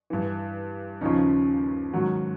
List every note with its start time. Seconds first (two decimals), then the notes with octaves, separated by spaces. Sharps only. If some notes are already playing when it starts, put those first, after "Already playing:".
0.10 G2 E3
1.01 D#2 C#3 F3 C#4 D#4
1.93 G#2 D#3 F#3